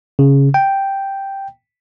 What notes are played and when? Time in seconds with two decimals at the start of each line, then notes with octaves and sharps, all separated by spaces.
0.19 C#3
0.54 G5